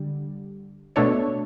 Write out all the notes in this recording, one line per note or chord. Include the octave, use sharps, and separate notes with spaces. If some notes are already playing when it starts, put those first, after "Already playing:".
Already playing: D3 G3
B2 A3 D4 A4 C#5